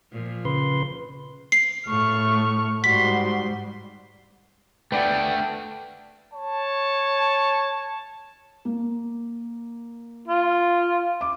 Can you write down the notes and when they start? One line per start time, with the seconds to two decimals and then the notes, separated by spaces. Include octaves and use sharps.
0.12 A#2 F3
0.45 C#3 B4 C6
1.52 C7
1.87 A2 A3 C#6 F6
2.84 G#2 G3 F#4 C6 B6
4.92 A3 D4 B4 D5 F#5 G5
6.34 C#5 A5
8.65 A#3
10.28 F4
11.21 D6